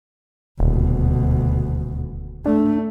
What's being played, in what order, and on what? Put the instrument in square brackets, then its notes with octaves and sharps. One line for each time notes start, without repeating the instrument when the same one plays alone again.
[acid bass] D#1 [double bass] D2 B2
[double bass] A3 [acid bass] D4